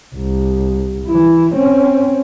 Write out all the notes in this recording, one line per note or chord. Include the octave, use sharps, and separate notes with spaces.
C2
E3 E4
C4 C#4